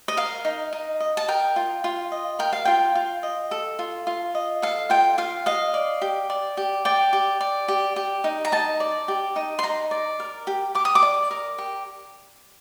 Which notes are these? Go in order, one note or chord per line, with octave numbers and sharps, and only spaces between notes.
D#5
A#4 F5
D#4
D#4
D#5
A5
A#4 G5
F4
F4
D#5
A#4 G5
F5
F4 G5
F4
D#5
A4
F4
F4
D#5
A4 F5
F4 G5
F4 F5
D#5 F5
D5
G4
D5
G4
D5 G5
G4
D5
G4
G4
D#4
A#5
D#4 A5
D5
G4
D#4
C6
D#4 A#5
D5
A#4
G4
G4 D6
D#6
D6
D5
A#4
G4